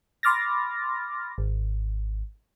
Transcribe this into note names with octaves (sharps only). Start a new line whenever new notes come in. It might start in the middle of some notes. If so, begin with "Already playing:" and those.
B5 C6 D6 F6 A6 A#6
G#1